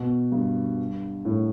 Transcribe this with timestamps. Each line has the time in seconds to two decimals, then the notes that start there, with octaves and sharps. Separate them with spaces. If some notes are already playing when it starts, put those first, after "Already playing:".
Already playing: B2
0.32 G2
1.25 A2